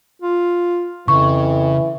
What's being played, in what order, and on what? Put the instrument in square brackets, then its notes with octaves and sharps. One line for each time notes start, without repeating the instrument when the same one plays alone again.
[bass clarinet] F4
[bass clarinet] F2 [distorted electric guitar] C#3 [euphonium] E3 [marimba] C#6